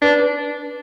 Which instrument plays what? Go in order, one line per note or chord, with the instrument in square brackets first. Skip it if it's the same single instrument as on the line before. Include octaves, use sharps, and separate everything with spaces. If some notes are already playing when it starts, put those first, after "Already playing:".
[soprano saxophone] D4 [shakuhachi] B4